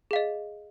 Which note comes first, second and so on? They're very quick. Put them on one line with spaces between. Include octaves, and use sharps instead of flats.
G#4 F5 D#5